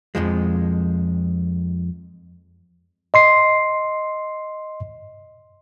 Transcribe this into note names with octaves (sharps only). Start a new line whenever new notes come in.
F2 G#2 F3 G#3
D#5 C6 C7